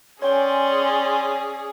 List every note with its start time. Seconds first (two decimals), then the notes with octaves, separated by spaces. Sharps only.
0.22 C#4 G#4 C#5 D5 G5 C6